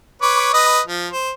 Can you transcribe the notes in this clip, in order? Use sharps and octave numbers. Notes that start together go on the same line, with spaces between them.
B4 C#5 D6
B4 D#5
F3
C5